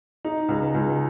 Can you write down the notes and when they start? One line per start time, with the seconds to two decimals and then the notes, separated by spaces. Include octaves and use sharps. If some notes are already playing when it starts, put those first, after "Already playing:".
0.25 D#4
0.49 C#2
0.74 C#2